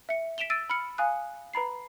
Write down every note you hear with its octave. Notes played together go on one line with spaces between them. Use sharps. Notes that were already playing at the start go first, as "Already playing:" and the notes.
E5 C#7
B6 D7 E7 F7 G7
E6 A6 D7 D#7
B5 F6 C#7
F5 G#5 D#6 F#6
B4 A#5 B5 C7